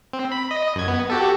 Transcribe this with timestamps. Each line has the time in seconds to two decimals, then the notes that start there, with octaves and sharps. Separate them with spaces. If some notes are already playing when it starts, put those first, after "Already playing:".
0.13 C4
0.32 B5
0.51 D#5
0.75 F#2 G#6
0.88 B3
1.10 F#4 G4 A4